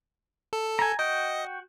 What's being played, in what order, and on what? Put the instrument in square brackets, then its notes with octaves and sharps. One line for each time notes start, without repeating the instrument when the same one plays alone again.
[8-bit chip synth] A4
[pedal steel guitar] G#5 A#5
[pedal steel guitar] F#4 G5 [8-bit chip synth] D#5